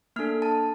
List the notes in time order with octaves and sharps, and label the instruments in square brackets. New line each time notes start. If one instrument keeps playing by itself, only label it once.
[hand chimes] A#3 D4 A4 F6
A5